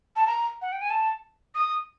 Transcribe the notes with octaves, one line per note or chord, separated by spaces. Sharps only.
A5
A#5
F#5
G5
G#5
A5
D#6